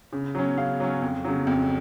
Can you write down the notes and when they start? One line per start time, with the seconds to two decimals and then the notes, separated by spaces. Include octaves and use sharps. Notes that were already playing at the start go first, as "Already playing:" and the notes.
0.13 C#3
0.35 F#3 C#4
0.57 C#3 F5
0.80 F#3 C#4
1.02 F2
1.25 C#3 F#3
1.47 F2